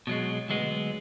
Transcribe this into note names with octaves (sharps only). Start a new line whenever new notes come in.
B2 F#3 G#3
D2 F#3 G#3 B3